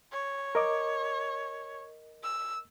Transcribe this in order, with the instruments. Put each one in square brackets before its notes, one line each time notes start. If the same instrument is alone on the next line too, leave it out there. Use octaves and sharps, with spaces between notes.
[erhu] C#5
[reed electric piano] A#4 D#5 D6
[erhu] E6